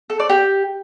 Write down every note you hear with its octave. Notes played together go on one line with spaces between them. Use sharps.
A4
D5
G4